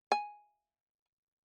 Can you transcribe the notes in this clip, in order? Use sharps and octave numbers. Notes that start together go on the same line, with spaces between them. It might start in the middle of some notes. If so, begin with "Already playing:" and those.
G#5